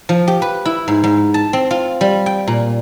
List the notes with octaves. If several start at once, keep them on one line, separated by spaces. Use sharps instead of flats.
F3
G4
B4
E4
G#2
G#2
A5
C4
F4
G3
G5
A#2